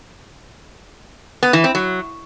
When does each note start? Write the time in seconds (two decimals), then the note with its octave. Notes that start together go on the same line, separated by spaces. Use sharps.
1.43 B3
1.53 E3
1.64 C4
1.75 F#3